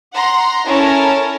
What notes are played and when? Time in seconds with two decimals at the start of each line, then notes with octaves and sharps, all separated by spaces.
0.14 F#5 A#5 C6
0.66 C#4 E4 A4 A#4 C#5